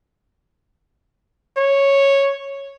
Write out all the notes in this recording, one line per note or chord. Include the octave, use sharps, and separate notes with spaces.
C#5